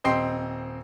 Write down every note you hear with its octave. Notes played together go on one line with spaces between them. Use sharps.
D#1 C4 D#5 G5 C6 C7